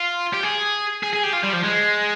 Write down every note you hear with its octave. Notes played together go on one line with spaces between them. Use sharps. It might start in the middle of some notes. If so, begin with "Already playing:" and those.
Already playing: F4
G4
G#4
G#4
G#4
G4
F4
G3
F3
G#3